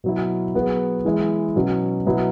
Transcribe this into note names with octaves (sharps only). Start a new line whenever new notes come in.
B2 F#3 E4
F#3 B3 G#4 B4
E3 G#3 E4
B2 F#3 C#4
B2 F#3 B3 E4